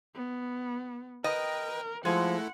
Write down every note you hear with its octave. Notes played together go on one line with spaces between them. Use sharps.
B3
A#4 B4 D#5 G5
F3 G#3 A3 E4 A4 F#5